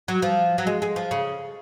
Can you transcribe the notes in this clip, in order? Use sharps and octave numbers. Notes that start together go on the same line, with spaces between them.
F#3
F3
F#3
G#3
G#3
F3
C#3